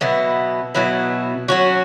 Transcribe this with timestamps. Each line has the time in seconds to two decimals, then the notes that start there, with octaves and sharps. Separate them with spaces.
0.01 B2 F#3 B3 E4
0.75 B2 F#3 B3 E4
1.48 F#3 C#4 F#4